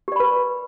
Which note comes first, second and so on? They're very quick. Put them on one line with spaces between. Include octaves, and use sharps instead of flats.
G4 D5 B5 B4